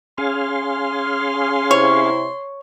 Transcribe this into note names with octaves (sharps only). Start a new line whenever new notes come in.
C#4 G#4 F5 C6
C3 E4 C5 C#5